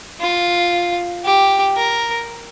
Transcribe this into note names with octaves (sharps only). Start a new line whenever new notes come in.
F4
G4
A#4